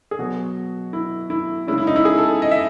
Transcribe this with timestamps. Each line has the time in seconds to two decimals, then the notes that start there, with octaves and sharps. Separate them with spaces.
0.11 G#4
0.19 B2 F#3 B3 F#4
0.93 E4
1.30 E4
1.67 C#3 G#3 C#4 E4
1.78 E4
1.87 D#4
1.96 E4
2.05 G#4
2.18 A4
2.42 D#5
2.51 E5